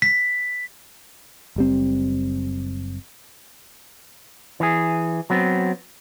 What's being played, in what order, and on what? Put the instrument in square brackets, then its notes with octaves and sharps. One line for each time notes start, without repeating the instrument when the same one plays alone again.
[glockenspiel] B6
[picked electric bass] F#1 G3 C4
[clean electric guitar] E3 G#4
F#3 B3 C4